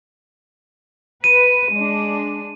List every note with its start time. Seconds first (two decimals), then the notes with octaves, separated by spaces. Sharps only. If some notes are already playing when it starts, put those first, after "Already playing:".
1.24 B4 D#7
1.72 G#3 D4